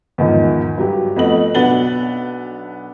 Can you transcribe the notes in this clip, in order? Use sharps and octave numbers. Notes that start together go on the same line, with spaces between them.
E2 G#2 D#3 F3
G2 F#3 G4
F2 A3 B3 D#5 F#7
B1 B3 D4 A6 F#7 G7